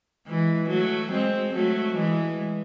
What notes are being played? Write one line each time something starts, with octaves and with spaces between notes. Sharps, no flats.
E3 G#3
F#3 A3
G#3 C4
F#3 A3
E3 G#3